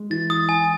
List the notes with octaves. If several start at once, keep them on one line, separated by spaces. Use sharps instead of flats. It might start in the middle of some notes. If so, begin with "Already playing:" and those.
Already playing: G#3
E3 E4 A6
D#6
G#5